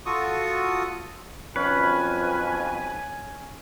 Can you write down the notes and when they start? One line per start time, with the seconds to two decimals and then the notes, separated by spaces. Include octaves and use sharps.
0.06 F4 F#4 A4 C#6 D#6
1.56 B1 F2 C#4 B4 G#5